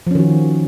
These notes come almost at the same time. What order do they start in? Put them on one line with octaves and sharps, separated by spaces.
F3 C#4 D#3 F#4